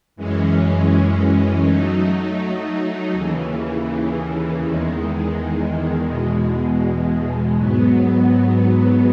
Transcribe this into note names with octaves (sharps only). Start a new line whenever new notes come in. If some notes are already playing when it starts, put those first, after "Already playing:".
F#2 E3 G#3 C#4
F#3 A3 D#4
D#2 C#3 E3
E2 D#3 G#3
E2 B2 G#3
G#2 F#3 B3